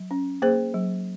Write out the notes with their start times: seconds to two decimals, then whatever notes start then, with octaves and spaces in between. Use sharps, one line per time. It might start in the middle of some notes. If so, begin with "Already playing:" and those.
Already playing: F#3
0.11 C#4
0.42 A#3 G#4 C5
0.74 F#3